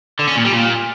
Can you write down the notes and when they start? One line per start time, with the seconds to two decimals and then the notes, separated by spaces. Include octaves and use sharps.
0.19 D3
0.28 C#4
0.36 A#2
0.44 G3
0.53 A#2